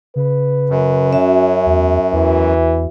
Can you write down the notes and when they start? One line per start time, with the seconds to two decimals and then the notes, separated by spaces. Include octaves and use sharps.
0.16 C#3 B4
0.69 F#2
1.13 C#4 F#4 E5
1.66 E2
2.13 E2 E3